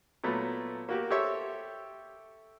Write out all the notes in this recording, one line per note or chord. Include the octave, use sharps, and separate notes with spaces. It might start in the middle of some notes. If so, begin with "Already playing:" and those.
A#2 F#3 A3 B3
A#3 F#4 G4
G4 A4 C5 C#5 E5